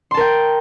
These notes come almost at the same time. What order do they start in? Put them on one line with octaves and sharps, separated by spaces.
C6 A5 A#4 G5